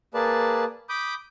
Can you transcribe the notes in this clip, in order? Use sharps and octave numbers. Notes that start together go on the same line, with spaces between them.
A#3 G#4 B4 D5 A5
B5 D6 D#6 G6